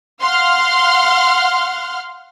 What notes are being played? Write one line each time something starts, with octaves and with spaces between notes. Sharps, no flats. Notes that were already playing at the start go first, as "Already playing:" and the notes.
F5 F#5 C6 F6